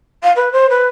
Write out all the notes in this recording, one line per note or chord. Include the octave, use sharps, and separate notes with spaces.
F5
B4
C5
B4